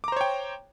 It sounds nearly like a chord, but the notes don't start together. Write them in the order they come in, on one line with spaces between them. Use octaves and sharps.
D6 A#5 C5 C#5 G5